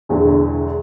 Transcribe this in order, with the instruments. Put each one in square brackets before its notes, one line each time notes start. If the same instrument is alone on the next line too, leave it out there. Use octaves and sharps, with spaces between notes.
[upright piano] E1 E2 D3